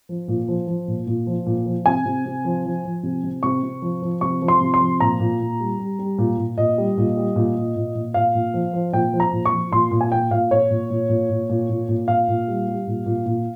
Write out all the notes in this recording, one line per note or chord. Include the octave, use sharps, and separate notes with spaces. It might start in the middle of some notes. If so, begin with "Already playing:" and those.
F3
A#2
F3
F3
A#2
A#2
F3
A#2
F3
C3 G#5
C3
C3
F3
F3
F3
C3
C3
C3 C#6
C3
F3
F3
C3 C#6
F3
C6
C3
C6
F3
A#2 A#5
A#2
A#2
G3
G3
G3
A#2
A#2
A#2 D#5
G3
A#2
G3
A#2
A#2
A#2
A#2
A#2 F5
A#2
F3
F3
A#2 G5
F3
A#5
A#2
C#6
F3
A#2 C6
A#2
G#5
A#2 G5
A#2 F5
A#2 C#5
A#2
A#2
A#2
A#2
A#2
A#2
A#2
A#2 F5
A#2
G3
G3
A#2
A#2
A#2